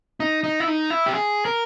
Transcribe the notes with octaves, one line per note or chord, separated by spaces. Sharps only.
D#4
D#4
E4
D#4
E4
G4
G#4
A#4